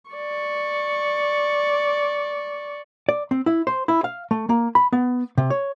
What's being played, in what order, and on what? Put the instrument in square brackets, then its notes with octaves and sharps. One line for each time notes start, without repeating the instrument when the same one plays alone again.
[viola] D5 C#6
[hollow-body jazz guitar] D5
C4
E4
C5
E4
F5
A3
A#3
B5
B3
C3
C#5